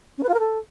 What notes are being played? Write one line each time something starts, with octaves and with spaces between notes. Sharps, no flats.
C#4
B4
F4
A#4
A4